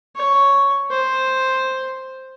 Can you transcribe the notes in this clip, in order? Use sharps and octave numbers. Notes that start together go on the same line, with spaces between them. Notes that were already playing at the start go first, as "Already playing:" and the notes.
C#5
C5